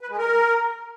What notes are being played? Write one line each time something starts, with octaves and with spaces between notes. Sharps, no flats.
B4
G#3
A#4